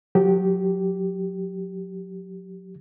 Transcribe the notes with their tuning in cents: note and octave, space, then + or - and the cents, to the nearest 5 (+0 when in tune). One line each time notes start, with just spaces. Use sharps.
F#3 -30 G4 -10